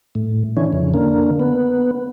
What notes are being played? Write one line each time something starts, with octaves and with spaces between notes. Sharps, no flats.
A2
D3 E3 C#4
F2 C#3
D3 A#3
B3